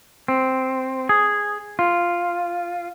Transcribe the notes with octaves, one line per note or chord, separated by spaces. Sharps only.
C4
G#4
F4